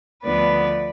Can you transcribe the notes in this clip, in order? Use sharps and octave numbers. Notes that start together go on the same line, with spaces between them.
D2 D3 F3 B3 B4 D5